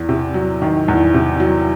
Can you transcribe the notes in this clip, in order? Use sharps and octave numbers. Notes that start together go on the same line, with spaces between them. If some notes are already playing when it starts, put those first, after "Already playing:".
Already playing: E2
C3
F#3
D#3
E2
C3
F#3